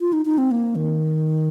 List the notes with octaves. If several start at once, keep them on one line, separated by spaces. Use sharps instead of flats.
F4
D#4
D#4
C4
A#3
D#3